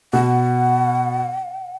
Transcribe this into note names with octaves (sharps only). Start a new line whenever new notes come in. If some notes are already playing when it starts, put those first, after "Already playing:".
B2 F#5